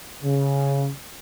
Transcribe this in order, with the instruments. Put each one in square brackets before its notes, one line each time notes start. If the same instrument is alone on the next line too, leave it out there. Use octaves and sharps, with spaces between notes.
[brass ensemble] C#3